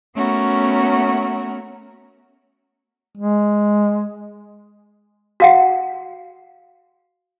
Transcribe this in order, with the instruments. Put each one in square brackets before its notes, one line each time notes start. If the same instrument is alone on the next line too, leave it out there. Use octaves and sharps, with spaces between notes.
[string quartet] A3 B3 C#4 F#4 A#4
[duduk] G#3
[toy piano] F#4 F5 F#5